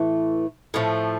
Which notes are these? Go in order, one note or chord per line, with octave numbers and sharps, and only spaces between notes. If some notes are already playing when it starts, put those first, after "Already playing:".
Already playing: A2 E3 A3
A2 F3 A3